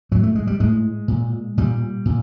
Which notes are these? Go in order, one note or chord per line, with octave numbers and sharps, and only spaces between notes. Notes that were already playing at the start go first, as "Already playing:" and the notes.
A2 F#3
A3
G#3
G3
A2 G#3
A#2
A#2 G3
A#2